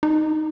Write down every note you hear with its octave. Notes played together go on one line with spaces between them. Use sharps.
D#4